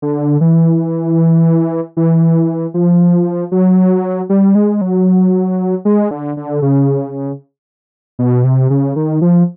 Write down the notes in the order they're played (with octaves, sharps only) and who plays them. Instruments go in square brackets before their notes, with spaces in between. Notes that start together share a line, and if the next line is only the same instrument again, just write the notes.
[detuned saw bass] D3
E3
E3
F3
F#3
G3
G#3
F#3
G#3
D3
D3
C#3
B2
C3
C#3
D#3
F3